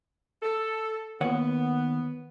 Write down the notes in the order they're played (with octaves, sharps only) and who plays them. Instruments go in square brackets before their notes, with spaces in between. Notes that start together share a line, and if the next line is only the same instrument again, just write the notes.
[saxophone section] A4
[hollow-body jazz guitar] D#2 C#5 F#5 [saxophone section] B3